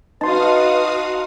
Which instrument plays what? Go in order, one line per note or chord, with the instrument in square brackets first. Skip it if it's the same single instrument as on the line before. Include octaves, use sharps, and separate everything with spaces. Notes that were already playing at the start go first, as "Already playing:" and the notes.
[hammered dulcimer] D#4 [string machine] F#4 F5 D#6 [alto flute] B4 [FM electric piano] A5 C6